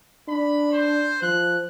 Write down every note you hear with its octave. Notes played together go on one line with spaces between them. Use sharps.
D4 B5
C5
F3 F#6